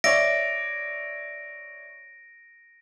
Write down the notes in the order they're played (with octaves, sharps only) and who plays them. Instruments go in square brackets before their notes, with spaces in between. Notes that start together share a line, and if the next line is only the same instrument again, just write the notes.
[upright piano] C#5 D5 E5 [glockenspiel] A#6 D7